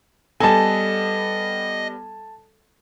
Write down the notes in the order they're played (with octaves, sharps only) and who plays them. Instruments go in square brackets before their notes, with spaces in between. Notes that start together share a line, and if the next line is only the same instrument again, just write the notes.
[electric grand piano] G3 B3 [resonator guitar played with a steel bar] A4 [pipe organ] D#5 [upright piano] G#5 A5